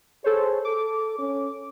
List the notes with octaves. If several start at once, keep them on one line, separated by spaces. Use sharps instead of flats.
G#4 A4 C5 C#5
A4 D6
C#4